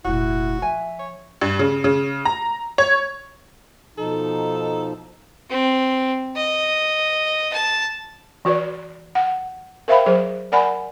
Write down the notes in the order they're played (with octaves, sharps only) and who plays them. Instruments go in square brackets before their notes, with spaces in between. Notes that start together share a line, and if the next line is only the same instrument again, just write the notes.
[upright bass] F1 A#2 [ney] E4 [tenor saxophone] F#4
[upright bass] F3 [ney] E5 [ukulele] G#5
[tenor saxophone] C#5
[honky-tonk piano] G2
C#3
C#3
A#5
C#5
[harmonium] B2 F3 D#4 [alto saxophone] A4
[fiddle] C4
D#5
A5
[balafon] E3 F#4 B4 D5
F#5
A#4 C5 E5 F5 G5 B5
F#3 G#4 C5
A#4 D5 F#5 G#5 B5